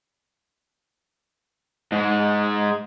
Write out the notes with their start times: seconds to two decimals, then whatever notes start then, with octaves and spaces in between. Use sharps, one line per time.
1.92 G#2 G#3